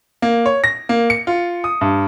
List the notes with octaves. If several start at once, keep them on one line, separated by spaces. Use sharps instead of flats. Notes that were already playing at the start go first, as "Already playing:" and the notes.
A#3
C#5
A#6
A#3
C#7
F4
D#6
G2